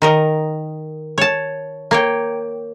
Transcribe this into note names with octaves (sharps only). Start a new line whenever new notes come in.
D#3 A#4 D#5
C#5 A5
A#3 C#5 G5